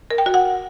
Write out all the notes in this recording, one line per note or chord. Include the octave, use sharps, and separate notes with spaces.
A#4
G5
F#4
F#5